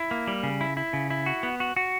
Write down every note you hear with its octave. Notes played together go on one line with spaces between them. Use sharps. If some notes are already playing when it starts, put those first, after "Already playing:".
Already playing: E4
A#3
G3
C#3
E4
E4
C#3
E4
F#4
B3
F#4
F#4